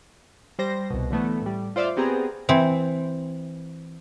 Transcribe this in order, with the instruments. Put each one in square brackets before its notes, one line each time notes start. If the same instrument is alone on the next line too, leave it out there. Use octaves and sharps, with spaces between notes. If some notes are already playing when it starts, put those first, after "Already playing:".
[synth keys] G3 C5 A#6
C2 B2
D3 E3 A3 B3
A2 G3
F4 C5 D5 E5 F5
B3 C4 G4 G#4 A#5
[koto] E3 C4